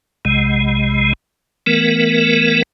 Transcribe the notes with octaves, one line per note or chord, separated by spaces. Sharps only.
B1 C3 G#3
E3 A3 B3 A#4